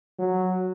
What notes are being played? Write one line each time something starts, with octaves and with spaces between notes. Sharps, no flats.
F#3